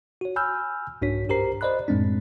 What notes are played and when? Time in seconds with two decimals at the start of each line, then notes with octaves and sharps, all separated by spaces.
0.21 F#4 C#5
0.36 G#5 B5 E6 F6 G6
1.02 C2 G#2 D4 F#4 C#5 B6
1.29 G2 G4 A#4 C5 A#5 C7
1.61 C5 D5 D#5 B5 F#6
1.88 F#2 A2 G#3 C4 D4